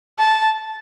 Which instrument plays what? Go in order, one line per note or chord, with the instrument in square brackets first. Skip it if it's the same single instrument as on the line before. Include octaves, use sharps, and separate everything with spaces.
[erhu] A5